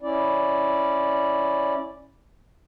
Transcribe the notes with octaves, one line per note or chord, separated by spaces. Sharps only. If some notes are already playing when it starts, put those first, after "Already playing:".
C#4 E4 D5